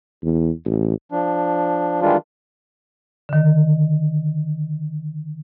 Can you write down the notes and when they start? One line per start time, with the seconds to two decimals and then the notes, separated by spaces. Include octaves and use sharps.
0.23 E2
0.66 A1
1.12 F3 D4
2.02 D#3 E3 G3 G#3 D4 F4
3.29 D3 D#3